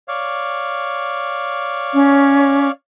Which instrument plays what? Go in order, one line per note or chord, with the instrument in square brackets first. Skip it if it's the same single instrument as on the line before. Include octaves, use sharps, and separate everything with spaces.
[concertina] C#5 D5 F5
[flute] C#4